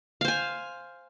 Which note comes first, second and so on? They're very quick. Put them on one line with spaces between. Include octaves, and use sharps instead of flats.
F5 C5 G#5